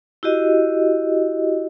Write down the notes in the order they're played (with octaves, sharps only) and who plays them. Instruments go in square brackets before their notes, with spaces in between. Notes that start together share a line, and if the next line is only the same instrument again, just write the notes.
[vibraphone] E4 F#4 G4 D#5